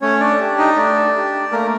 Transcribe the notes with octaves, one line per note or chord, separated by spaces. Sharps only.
A3 C#4 C#5
D4 D5
D4 G4
D#4 D#5
A3 D4 D5
D4 G4
A3 A#3 A#4